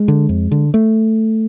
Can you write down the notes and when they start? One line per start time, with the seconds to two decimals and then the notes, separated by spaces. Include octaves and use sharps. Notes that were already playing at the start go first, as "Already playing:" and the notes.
Already playing: G#3
0.08 D3
0.29 F2
0.51 D3
0.74 A3